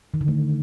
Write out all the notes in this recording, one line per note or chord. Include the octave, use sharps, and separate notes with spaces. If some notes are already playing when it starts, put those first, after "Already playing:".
D#3
D3
A3